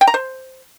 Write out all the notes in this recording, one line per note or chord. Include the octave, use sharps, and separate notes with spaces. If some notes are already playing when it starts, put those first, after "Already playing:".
G5
A#5
C5